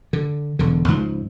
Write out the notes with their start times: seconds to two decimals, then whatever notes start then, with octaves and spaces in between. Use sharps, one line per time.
0.13 D3
0.59 E1 D3
0.88 C#2 G#2 F3